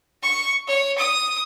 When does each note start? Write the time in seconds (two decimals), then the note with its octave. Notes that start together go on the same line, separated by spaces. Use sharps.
0.23 C#6
0.68 C#5
0.98 D#6